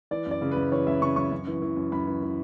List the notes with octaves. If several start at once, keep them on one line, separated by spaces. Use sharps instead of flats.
E3 D5
F#2
D5
C#3
F#2 B4
E3 C#5
F#2 E5
C#3 C#6
F#2 C#6
F#2
E3
E3
F#2
F#2 B5
E3
E3